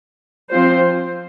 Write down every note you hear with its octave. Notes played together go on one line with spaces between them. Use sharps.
F3 C4 F4 C5